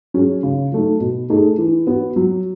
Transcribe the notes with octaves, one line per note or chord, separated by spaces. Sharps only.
F#3 C#4 G#4
C#3
F#3 A3 D#4
B2
A3 D#4 G#4
E3
B3 F#4
F#3